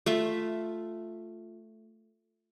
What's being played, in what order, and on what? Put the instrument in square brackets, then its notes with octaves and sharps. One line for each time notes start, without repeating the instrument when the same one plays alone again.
[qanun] A3 F4 E5